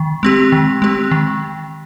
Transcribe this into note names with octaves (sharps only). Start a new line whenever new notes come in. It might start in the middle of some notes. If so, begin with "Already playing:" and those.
Already playing: D#3
G#3 C4 G4
D#3
G#3 C4 G4
D#3